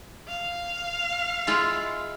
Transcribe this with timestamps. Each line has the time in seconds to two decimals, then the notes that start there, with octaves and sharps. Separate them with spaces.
0.28 F5
1.47 G#3 E4 F4